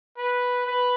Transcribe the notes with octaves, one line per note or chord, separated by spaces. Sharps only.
B4
B4